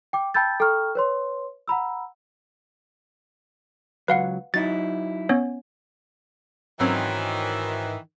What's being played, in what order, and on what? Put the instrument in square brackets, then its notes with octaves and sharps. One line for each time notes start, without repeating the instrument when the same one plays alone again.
[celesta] G5 D6
G5 A5 B5 E6 G6 A6
A4 G5 A#5 C#6 F6
B4 C#5 C6
F#5 A#5 B5 E6
[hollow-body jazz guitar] C#2 F#3 [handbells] B4 F5 F#5
[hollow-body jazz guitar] F#3 D#4 E4 [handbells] A6
[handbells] B3 C#4 C#5
[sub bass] G#2 [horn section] D#3 E3 [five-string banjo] F#3 C4 C#4